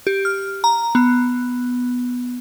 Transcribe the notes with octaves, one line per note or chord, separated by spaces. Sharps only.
G4
F6
A#5
B3